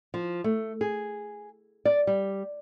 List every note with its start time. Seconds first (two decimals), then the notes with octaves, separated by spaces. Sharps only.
0.14 F3
0.44 A3
0.81 G#4
1.85 D5
2.07 G3